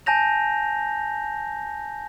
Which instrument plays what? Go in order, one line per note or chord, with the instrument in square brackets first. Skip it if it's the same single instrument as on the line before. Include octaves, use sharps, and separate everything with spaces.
[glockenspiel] G#5 A5 G6 A#6 F7